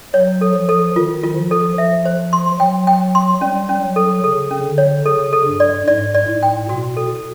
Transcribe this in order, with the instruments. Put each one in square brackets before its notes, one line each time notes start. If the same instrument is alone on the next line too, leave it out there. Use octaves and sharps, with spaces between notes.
[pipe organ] F#3 [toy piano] C#5
[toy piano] A4
[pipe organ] F3
[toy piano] A4
[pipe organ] D#3 [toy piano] F4
[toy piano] F4
[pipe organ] F3
[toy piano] A4
[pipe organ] F3 [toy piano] E5
[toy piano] C5
C6
[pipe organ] F#3 [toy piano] G5
[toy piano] G5
C6
[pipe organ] G3 [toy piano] C#4
[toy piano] C#4
[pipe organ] F#3
[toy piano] A4
[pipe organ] C#3 [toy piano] A4
[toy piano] C#4
[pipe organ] D3
[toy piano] C#5
[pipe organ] C#3 [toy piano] A4
[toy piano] A4
[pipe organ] G2
[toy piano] D5
[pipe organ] G#2 [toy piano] D5
[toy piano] D5
[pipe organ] A2
[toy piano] G5
[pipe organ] B2 [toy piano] F#4
[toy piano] A4